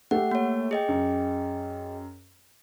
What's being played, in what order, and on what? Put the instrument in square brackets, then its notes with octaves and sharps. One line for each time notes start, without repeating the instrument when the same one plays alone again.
[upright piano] A3 G4 [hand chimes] F#5
[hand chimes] A#3 C#5
G#4 D#5 G5
[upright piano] F#2